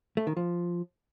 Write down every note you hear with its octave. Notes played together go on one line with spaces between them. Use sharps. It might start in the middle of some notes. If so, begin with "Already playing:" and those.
A3
D#3
F3